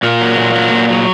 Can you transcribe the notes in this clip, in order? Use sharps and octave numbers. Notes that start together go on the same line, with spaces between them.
A#2 A#3
F#3
A#2
F#3
A#2
F#3